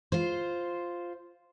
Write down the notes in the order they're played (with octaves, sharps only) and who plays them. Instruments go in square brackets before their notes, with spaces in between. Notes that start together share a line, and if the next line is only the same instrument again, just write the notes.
[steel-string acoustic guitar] F4 C5